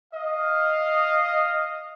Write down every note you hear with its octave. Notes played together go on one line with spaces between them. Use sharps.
D#5 F5